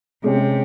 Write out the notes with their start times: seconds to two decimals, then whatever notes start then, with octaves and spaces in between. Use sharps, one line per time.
0.24 C3 G#3 C#4 G4